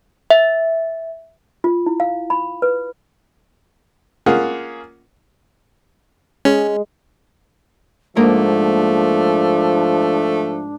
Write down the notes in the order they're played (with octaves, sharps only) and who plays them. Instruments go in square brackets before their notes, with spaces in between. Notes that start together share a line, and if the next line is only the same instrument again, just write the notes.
[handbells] E5
[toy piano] F4
E4
F5
B5
B4
[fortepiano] A#3 C#4 F4 G#4 F#5
[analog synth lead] G#3 [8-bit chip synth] C#4
[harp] G#2 A#3 A#4 [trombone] F3 [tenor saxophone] A3 [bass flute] D4